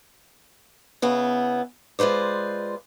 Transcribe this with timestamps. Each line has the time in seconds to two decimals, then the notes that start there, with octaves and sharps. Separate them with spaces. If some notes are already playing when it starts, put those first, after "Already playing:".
1.02 C#3 B3 E4
1.99 G#3 F4 B4 C5 D5